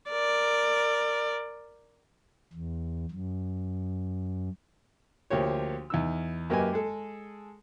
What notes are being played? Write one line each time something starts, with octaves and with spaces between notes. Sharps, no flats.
A#4 D5
E2
F#2
D2 F3 A#3 G4 C#5
E2 D#4 E6
F#2 A#3 G4 B4 D#5 G#5
G#3 G#4 A4